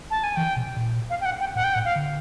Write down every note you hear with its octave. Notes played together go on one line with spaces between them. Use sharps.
A5
G#5
E3 G5
B2
A#2
F5
G5
F#5
G5
A2 F#5
G5
A2 F#5
F5
D3